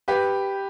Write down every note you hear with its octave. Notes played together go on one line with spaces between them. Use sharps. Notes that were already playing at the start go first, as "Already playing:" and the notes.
G4 B4